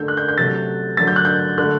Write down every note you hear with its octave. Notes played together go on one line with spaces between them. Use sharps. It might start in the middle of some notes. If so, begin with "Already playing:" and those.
Already playing: D3 A3 G6
F#6
G6
G6
C3 F#3 A3 A6
D3 F#3 A3 A6
G6
F#6
G6
D3 A3 F#6